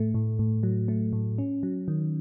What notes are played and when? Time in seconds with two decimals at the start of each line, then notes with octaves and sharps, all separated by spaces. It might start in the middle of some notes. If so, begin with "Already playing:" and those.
Already playing: A2 A3
0.14 A2
0.39 A2
0.63 F#3
0.88 A3
1.13 A2
1.38 C#4
1.63 F#3
1.88 D#3